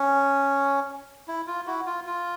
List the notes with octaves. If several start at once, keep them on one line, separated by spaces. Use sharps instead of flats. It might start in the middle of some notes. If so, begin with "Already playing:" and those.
Already playing: C#4
E4
F4
E4 F#4
F4
F4